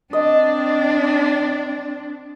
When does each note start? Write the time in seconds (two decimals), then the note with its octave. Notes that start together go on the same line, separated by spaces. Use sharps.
0.13 C4 D4 D#5